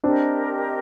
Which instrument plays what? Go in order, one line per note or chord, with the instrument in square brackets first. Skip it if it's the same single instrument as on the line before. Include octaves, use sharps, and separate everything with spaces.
[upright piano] C4 D4 [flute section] G4 A#4 D#5